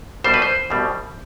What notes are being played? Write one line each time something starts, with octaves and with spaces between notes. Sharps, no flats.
C2 B2 G3 C5
B4
C5
C2 B2 G3